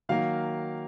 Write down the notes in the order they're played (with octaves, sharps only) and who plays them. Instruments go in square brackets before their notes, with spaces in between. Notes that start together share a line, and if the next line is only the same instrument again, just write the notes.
[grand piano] D#3 F#3 A#3 F5